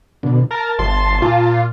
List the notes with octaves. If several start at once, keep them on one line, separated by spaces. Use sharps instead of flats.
B2 D3
A#4 A5
G1 C6
A#2 F4